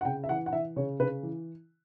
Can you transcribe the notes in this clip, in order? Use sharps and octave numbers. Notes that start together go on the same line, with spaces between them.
F#5
C#3 G5
E5
E3 F#5
F#5
E3 E5
C#3 C#5
C#3 B4
E3